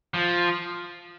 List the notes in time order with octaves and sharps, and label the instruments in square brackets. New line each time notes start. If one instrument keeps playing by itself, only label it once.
[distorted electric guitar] F3